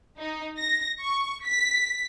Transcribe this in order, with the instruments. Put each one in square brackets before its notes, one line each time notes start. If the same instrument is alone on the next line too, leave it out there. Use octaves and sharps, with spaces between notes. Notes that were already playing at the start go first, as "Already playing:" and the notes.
[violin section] D#4
A#6
C#6
B6